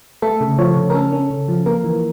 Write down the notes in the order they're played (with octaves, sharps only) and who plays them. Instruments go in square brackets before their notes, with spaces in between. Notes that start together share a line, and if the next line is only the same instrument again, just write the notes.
[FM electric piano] A3 A4
C#3
F3 C#5
C#3
A#4
C#4 A4
C#4
C#3
F3
A#3 A#4
E3